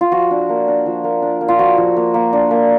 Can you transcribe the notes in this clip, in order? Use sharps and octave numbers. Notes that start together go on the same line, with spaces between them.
F4
F3 F#4
D4
A#3
D4
F3
A#3
D4
A#3
F4
F3 F#4
F3
A#3
A#3
D4
A#3